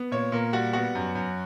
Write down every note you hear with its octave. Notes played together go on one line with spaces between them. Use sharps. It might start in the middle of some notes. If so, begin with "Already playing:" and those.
Already playing: B3
A#2 C#5
A#2 A#4
G3 F#4
B3 F#4
F#2
F#2